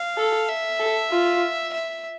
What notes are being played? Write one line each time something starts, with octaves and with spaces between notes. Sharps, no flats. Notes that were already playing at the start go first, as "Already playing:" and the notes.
Already playing: F5
A4
E5
A4
F4
E5